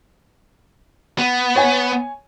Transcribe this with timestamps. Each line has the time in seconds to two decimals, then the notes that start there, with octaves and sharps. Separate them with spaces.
1.19 B3
1.55 C#5 G#5